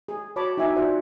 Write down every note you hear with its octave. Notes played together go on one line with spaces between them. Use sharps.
G#4
F#4 C#5 A5 B5 D6
D#4 E4 F#4 E5 G#5 D6
F4 F#4 C5 D5 F5 F#5